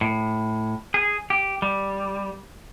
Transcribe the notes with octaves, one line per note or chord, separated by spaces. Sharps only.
A2
G#4
G4
G3